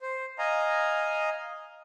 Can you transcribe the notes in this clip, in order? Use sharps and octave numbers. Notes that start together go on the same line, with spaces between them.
C5
D#5 F5 G#5 A#5